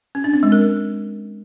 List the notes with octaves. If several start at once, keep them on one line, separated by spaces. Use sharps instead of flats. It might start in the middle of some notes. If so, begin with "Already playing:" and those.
C#4
D4
C4
G#3
A#4